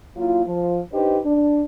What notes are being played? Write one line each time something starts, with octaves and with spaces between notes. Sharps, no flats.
F#3 A#3 E4 F4
F3
D4 D#4 G4 B4 C5 D#5
D4